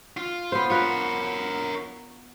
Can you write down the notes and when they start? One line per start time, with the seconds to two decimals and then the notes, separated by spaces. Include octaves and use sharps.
0.17 F4
0.52 B3 C5
0.70 F4 A#4 B4 C#5